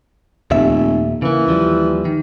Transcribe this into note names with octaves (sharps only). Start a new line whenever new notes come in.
F1 D#2 A#2 E5
C#3 E3 A#3
D#2 F3 G3
D#3